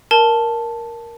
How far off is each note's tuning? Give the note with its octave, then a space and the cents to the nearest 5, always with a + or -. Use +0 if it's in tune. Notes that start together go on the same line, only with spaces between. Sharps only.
A#4 +5 A5 +0